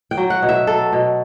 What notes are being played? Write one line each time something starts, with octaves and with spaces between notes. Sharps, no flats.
G5
F#3
F#5
B2
E5
F#3 A4
B2